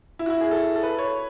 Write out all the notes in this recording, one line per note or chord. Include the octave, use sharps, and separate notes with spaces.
E4
F#4
E4
G#4
A4
A4
B4
C#5